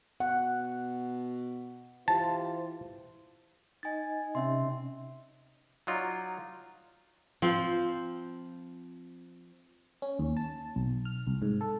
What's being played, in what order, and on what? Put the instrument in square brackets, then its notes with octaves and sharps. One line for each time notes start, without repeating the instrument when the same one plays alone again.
[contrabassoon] B2 [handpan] F#5
[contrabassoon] E3 [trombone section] F4 G4 C5 [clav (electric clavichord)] A5
[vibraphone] D#4 D#5 [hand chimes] G#5 A6
[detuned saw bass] C3 [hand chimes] C#4 E5 C6
[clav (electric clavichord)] F#3 D#4 F4 D5
[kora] F3 C4
[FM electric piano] C#4
D#2
A5
B1
F6
C2
G#2
A4